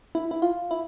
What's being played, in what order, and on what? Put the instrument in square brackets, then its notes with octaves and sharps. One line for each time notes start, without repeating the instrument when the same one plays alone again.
[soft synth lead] E4
E4
F4
E4